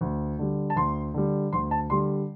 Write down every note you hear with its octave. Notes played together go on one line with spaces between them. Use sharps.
D2
D3 G3
A5
D2 C6
D3 G3
D2 C6
A5
D3 G3 C6